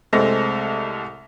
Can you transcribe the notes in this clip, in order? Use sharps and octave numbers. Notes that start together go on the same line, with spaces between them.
C2 G#3 A3 C4 A4 A#6